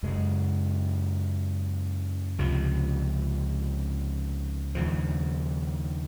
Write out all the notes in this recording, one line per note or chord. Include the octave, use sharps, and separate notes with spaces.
F#2 C#3 G#3
C#2 C3 F3
D#2 C#3 F3